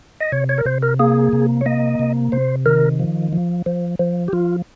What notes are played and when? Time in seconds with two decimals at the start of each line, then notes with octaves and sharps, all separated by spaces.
0.21 D#5
0.32 C3 C#5
0.49 C#5
0.58 A#4
0.65 C3 C5
0.83 A#4
0.99 A#3 G#4
1.33 C3
1.61 C#5
1.66 A#3 D#5
1.99 C3
2.32 C3 C5
2.66 D#3 A#4
3.00 F3
3.33 F3
3.66 F3
3.99 F3
4.28 G4
4.33 F3 F4